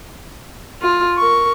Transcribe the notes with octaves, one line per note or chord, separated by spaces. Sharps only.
F4
A#4 C#6